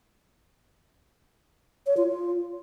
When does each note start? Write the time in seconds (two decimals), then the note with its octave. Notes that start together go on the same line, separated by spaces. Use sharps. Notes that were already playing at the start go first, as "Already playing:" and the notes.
1.87 C#5
1.97 F4
2.07 F4